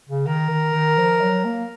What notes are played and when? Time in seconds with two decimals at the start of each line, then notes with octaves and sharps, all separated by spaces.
0.09 C#3
0.27 D#3 A#4
0.50 D#3
0.73 D#3
0.97 F3
1.21 F#3
1.44 A#3